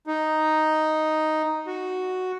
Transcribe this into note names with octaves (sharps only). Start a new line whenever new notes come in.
D#4
F#4